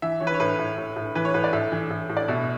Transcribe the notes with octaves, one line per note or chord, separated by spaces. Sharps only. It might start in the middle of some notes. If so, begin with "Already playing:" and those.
E3 E5
E3 C#5
B4
C#5
A2 B4
A2
A2
A2
E3 B4
C#5
A2 B4
D5
A2 E5
E3
A2
A2
D5
B2 E5